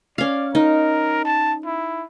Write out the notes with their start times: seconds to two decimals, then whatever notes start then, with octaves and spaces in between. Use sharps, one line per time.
0.18 C#4 D5 F5
0.55 D#4 A#4
1.25 A5
1.65 E4